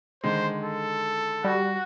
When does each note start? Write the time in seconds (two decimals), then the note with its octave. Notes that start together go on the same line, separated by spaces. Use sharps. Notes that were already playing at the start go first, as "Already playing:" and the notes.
0.24 D3 D#3 G#3 C5
0.64 A4
1.44 G3 F#4